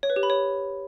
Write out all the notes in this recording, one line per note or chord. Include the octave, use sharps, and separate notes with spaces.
C#5
B4
G4
B5
C#5